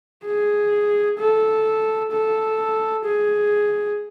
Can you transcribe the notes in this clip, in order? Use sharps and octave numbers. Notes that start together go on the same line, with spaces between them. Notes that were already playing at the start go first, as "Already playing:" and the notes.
G#4
A4
A4
G#4